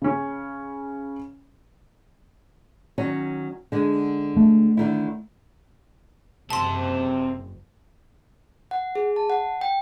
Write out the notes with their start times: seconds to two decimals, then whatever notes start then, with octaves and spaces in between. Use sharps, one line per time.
0.02 C#3 C#4
2.98 D#3 F#3 C#4
3.72 D3 G#3
4.37 A3
4.77 D3 D#3 E4
6.50 F#1 C3 C4 A4 A5 C6
8.71 F#5
8.95 G#4
9.16 A5
9.30 F#5
9.61 G5